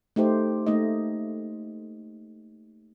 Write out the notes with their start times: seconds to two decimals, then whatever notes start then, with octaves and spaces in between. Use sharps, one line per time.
0.16 A3 D#4 G4 C5
0.67 A3 A#3 D#4 D#5